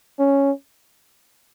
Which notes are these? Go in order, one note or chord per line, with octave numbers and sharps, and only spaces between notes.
C#4